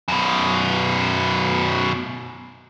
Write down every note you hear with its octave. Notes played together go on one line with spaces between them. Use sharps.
F#2 B2